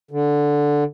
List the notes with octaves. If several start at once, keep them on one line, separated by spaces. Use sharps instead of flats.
D3